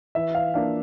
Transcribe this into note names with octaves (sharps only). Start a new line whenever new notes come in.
E3 E5
F5
A#3 D4 F4 F5